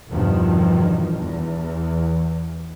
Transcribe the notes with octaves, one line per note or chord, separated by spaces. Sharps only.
E2 G2 B2 D#3 F3
E2